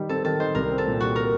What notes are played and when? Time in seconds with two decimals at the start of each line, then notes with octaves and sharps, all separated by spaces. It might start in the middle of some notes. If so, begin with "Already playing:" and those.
Already playing: D#3 G3 D#4
0.09 C4 A4
0.25 D#3 A4
0.40 D#4 C5
0.55 C2 A#4
0.70 C4
0.78 A4
0.86 A#2
1.00 G3 F#4
1.16 A#4